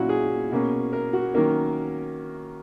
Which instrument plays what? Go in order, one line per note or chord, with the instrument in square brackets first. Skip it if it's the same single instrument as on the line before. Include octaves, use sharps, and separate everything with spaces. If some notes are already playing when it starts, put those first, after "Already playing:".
Already playing: [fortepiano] A#2 F#3 C#4 E4 F#4
G#4
B2 A#3 C#4
A#4
F#4
D#3 F#3 A#3 C#4 A#4